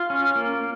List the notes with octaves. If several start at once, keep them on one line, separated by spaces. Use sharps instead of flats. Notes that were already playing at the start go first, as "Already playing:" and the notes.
Already playing: F4
C#4
A#3